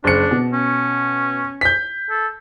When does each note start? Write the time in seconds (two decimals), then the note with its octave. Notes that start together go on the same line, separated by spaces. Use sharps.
0.04 F#1 D4 C#7
0.31 B2
0.53 C#4
1.61 G6 B6
2.10 A4